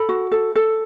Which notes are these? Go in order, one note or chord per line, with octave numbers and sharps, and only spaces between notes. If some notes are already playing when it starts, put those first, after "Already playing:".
Already playing: A4 B5
F#4
A4
A4